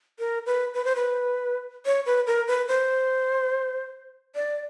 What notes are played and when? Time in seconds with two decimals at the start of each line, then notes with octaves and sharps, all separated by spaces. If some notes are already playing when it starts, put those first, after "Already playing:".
0.19 A#4
0.46 B4
0.74 B4
0.85 C5
0.96 B4
1.86 C#5
2.06 B4
2.27 A#4
2.47 B4
2.68 C5
4.35 D5